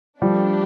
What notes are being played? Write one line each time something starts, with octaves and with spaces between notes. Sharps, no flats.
F3 G3 A3 D4 G4